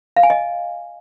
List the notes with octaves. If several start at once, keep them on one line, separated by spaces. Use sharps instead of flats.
F5
G#5
D#5